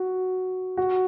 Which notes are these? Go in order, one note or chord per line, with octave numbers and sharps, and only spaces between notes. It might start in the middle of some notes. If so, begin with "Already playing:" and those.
Already playing: F#4
F#4